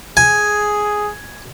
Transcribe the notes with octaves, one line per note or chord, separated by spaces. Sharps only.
G#4 G#5